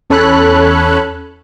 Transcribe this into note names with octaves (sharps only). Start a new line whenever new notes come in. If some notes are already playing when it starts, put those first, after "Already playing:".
E2 C#4 A4 C#5 B5 F#6